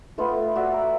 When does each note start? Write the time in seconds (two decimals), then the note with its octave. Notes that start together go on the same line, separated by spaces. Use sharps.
0.18 A3 B3 F4
0.55 F#4 D5 E5
0.73 A#5